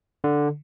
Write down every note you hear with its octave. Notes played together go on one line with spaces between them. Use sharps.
D3